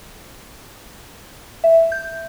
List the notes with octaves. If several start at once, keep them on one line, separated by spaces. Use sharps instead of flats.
E5
G6